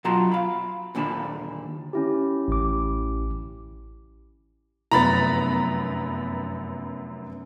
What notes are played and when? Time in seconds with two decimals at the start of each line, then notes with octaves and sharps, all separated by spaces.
0.05 B2 F#3 F4 A5 A#5 C6
0.32 F5 B5
0.95 D#2 A#2 D3 F#5 A5 B5
1.93 C#4 E4 G4
2.48 A1 D6
4.91 F1 F#2 B3 A#5 B5 A6